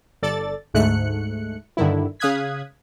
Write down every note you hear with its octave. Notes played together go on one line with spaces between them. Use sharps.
G1 A4 D5 A6
D2 G#2 A3 F#6 C#7
G2 D3 D#3 E4
C#3 F5 D#6 F#6 G#6 B6